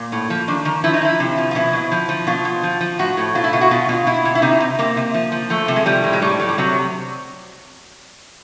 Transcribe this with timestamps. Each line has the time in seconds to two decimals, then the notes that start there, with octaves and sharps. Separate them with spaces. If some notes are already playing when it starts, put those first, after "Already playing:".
Already playing: A#2 A#3
0.12 A2
0.30 F3
0.48 D#3 D4
0.65 D#3
0.84 F3 E4
0.94 D#4
1.02 F3 E4
1.20 C3
1.37 F3
1.51 F4
1.55 B2 E4
1.73 B2
1.92 F3
2.09 F3
2.27 B2 F4
2.45 B2
2.63 F3
2.81 F3
2.99 A2 F#4
3.17 A2
3.35 B2 F4
3.44 E4
3.53 B2 F4
3.61 F#4
3.71 B2 F4
3.89 B2 F4
4.07 B2 E4
4.25 B2
4.35 E4
4.42 C3 D#4
4.60 C3
4.79 C3 A#3
4.97 C3
5.14 F3
5.32 F3
5.50 F3 A3
5.68 C3
5.76 G#3
5.86 F3 G3
6.04 A2
6.13 G#3
6.22 A2 G3
6.40 A2
6.49 G3
6.58 C3 F#3